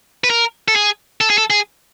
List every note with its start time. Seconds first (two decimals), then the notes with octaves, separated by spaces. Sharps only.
0.24 B4
0.30 A#4
0.68 A4
0.76 G#4
1.21 A4
1.30 G#4
1.38 A4
1.50 G#4